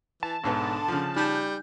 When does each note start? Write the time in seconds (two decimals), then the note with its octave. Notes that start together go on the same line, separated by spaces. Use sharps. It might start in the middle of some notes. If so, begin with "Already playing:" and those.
0.23 E3 A5
0.44 B1 G#2 D3 B3
0.88 C#3 F3
1.16 G3 D#4 G6